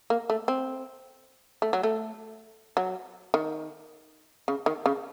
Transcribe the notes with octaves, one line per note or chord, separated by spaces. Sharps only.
A#3
A3
C4
A3
F#3
A3
F#3
D#3
C#3
D#3
C#3